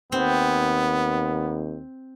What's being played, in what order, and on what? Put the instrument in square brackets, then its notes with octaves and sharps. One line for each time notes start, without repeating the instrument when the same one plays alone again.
[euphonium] D#2 [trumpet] B3 [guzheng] C4